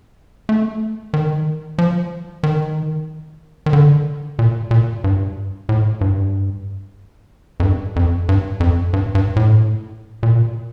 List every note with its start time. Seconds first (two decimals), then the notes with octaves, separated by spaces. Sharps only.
0.49 A3
1.14 D#3
1.78 F3
2.43 D#3
3.66 D#3
3.73 D3
4.39 A#2
4.71 A#2
5.04 G2
5.69 A2
6.01 G2
7.60 F2
7.63 G2
7.96 F2
8.29 G2
8.60 F2
8.93 G2
9.15 G2
9.36 A2
10.23 A#2